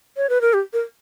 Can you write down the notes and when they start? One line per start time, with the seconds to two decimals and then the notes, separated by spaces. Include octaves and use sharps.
0.17 C#5
0.29 B4
0.41 A#4
0.54 G4
0.73 A#4